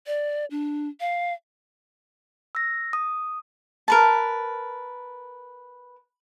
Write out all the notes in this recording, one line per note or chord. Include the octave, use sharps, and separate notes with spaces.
D5
D4
F5
E6 A#6
D#6
A#4 B4 A5